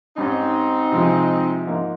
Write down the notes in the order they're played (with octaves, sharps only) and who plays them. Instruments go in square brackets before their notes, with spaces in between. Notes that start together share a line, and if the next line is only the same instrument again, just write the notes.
[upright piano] G#2 G3 C#4 [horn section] C4 D#4
[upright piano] C3 F3 G#3
G#2 F3 A#3 D#4